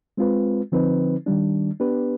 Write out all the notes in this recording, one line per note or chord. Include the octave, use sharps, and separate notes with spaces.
G#3 C4 F4 B4
D3 F3 C4 D#4 B4
D#3 G3 D4
B3 D4 G4 B4